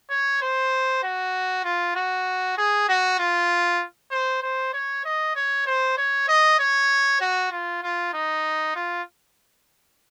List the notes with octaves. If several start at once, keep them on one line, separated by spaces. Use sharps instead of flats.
C#5
C5
F#4
F4
F#4
G#4
F#4
F4
C5
C5
C#5
D#5
C#5
C5
C#5
D#5
C#5
F#4
F4
F4
D#4
F4